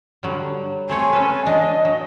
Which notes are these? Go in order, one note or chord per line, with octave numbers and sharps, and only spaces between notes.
D3 F#3 G3
A3 C4 C#5 G#5
C#4 A4 B4
E3 D4 D#5
F#3